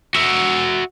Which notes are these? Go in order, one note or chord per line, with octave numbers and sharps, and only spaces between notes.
F#4 E5